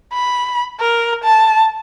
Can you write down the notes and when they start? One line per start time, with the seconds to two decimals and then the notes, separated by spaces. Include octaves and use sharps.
0.13 B5
0.80 A#4
1.24 A5